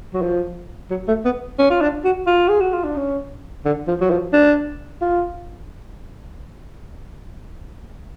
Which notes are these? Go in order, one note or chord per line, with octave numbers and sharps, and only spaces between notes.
F#3
F3
F#3
A3
B3
C#4
F4
D4
F#4
F4
G#4
F#4
F4
D4
C#4
D3
F3
F#3
F3
D4
F4